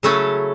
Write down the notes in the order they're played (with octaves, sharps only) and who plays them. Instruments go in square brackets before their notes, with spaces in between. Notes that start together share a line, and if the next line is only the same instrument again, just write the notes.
[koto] C#3 F#3 A3 C#4 E4 A4